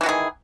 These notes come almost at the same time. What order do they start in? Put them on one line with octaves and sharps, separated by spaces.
E3 F#4 D#3 G#4